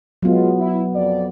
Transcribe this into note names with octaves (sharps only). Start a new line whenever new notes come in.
F#3 G#3 B3 F4
E4
F2 D5